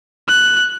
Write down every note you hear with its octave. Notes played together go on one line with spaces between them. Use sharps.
F#6